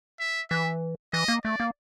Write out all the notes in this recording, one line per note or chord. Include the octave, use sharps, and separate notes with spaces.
E5
E3 E5
E3 D#5
A#3
A3 D5
A#3